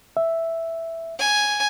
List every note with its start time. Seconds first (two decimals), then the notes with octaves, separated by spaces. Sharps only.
0.17 E5
1.19 G#5